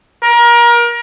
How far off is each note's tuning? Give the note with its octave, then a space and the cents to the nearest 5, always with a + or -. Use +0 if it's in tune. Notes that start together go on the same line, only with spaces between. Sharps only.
A#4 +30